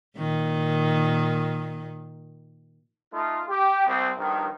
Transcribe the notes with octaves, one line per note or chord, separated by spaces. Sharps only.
A#2 D#3
A3 D#4 F4
G4
C2 C4
A#1 G2 D#3